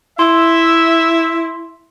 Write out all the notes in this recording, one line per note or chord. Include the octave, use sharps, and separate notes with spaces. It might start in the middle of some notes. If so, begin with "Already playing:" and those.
E4 E5 C6